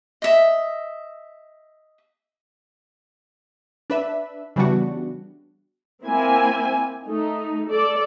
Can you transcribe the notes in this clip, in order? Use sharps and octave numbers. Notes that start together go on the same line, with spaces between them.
D#5 E5
D4 B4 E5
C#3 E3 G3 B3 D4 F#4
A#3 C4 E4 G#5
A3 D#4
A4 D5